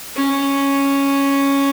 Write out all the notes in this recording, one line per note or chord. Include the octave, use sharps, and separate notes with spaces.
C#4